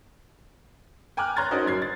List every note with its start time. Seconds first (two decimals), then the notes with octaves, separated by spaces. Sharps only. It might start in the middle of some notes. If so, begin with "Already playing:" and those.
1.17 G5 G#5 A#5 D6 F6 F#6
1.36 C#5 A#5 C6 F#6 G#6 A6
1.51 C#4 D#4 F#4 A#4 C5 D#5
1.67 F#2 G#6 C7
1.82 A6